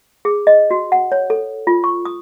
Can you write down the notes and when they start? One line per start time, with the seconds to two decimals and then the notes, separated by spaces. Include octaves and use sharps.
0.25 G#4
0.47 D#5
0.71 F#4
0.92 F#5
1.12 C#5
1.30 A4
1.67 F4
1.84 C#6
2.05 D#6